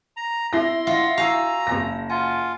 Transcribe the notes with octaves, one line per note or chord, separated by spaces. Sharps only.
A#5
E4 C6 A#6
F4 D#5 F#5
F#4 F5 G#5 A#5 E6
F#1 A#6
F4 F#5 G#5